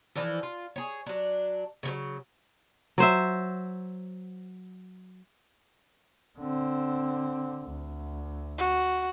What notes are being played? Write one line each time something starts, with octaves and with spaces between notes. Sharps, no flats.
E3 F3 D4 A4
F4
G#4 C#5
F#3 D4
C#3 F3 F#3
F#3 C5 E5
D3 C4
D2
F#4